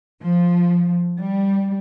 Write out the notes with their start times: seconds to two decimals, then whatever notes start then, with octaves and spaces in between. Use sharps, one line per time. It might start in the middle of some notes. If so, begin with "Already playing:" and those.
0.21 F3
1.19 G3